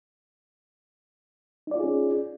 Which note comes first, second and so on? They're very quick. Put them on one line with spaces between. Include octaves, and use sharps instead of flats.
D#4 D5 F4 G#4 C#4